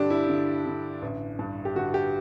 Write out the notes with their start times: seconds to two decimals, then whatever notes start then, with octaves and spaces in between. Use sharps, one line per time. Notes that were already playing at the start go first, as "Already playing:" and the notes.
Already playing: G2 D3 D4 G4
0.10 E4
0.28 D3
0.66 D3
1.02 A1
1.39 G2
1.65 G4
1.75 D3 F#4
1.94 G4